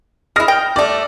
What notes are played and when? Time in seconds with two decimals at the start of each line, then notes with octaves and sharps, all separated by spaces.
0.36 G#3 E4 D#6 F6 A#6
0.48 G5
0.76 G3 A3 D5